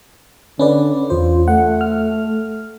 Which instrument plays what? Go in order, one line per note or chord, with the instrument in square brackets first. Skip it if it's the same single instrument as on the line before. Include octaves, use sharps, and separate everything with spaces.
[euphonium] D3 [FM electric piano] C#4 B4 D5
[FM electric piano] E2 C5 [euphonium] F4
[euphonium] A3 [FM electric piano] F#5
[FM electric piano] F6